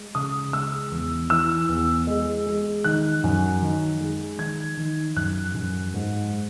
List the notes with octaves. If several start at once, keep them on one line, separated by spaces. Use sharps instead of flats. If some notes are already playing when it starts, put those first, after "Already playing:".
Already playing: G#3
C#3 D#6
G#3 E6
E2
E3 E6
E2
G#3
G#3
D#3 F#6
F#2
D#3
G#3
D#3 G#6
D#3
F#2 F#6
F#2
G#2